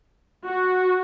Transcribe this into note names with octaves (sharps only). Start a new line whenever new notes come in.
F#4